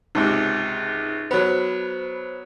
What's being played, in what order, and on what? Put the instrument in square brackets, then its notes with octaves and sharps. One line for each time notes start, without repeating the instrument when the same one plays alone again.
[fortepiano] C#2 G#2 C3 [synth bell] D#4
[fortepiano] F#3 B3 [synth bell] C5 B5